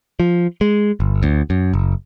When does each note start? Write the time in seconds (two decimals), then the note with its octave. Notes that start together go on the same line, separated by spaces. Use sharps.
0.20 F3
0.61 G#3
1.00 G1
1.23 D2
1.50 F#2
1.74 F#1